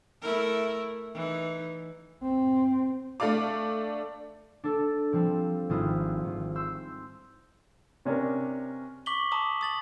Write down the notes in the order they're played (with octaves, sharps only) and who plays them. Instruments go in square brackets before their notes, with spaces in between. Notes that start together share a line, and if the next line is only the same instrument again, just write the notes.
[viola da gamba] A3 E4 A#4
E3 D#4
[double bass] C4
[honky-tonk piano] A3 D4 D5 F5 D6
[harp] D4 A4 D5
F3 G3 C4
G#1 G3 E4 F4 D#6
G#1
C6 E6 G6
[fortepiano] C3 C#4 D4 A#4
[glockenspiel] C#6 D6 B6 F#7 G7
A5 A#5 D6 D#6
D#6 A6 F#7